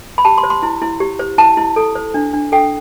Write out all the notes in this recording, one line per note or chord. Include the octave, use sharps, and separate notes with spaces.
B5
G4 A5
C6
C5
C6
E4
E4
G4
C5
E4 A5
E4
A4
C5
D4
D4
A4 G5